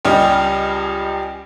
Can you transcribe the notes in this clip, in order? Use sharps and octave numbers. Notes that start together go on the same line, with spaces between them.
C#2 G3 C#4 G4 D#5 F6